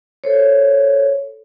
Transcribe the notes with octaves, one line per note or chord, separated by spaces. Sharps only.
A4 C5 C#5